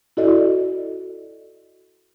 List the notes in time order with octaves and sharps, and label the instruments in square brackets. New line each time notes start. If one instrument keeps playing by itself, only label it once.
[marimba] E4 F#4 A4 D5 D#5